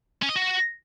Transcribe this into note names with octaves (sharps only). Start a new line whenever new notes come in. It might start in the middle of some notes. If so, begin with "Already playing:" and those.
C#4
D#5
F#4